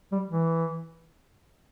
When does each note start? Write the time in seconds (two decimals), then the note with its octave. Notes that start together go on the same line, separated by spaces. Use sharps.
0.12 G3
0.30 E3